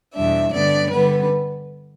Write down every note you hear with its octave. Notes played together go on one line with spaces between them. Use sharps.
E2 B2 G3 D4 E5
G2 D3 B3 D4 D5
D3 G3 B3 B4